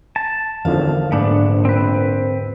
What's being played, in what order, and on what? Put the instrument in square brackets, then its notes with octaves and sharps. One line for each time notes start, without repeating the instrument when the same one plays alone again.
[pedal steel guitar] A5
[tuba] G#1 [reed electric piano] E2 D3 F3 [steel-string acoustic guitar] F5
[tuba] A#1 [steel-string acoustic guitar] G#2 [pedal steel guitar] A3 B3 D4
[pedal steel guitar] C4 B4